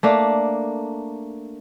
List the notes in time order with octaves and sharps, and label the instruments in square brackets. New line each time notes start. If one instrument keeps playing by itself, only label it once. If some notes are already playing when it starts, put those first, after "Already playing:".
[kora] A3 A#3 D4